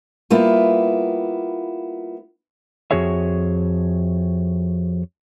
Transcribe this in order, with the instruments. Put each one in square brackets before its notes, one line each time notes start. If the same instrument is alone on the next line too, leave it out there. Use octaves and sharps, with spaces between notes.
[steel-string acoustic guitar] G3 A#3 B3 E4 F4
[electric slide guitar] F2 G#3 F#4 G#4 C#5 E5